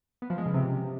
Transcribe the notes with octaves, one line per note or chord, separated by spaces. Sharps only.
B3
F3
G#3
C#3
C3